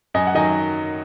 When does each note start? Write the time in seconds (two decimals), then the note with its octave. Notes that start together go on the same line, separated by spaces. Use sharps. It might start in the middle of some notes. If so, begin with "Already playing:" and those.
0.14 F#2 D#5 G#5
0.27 F#5
0.35 D#3 F#3 D#5 G#5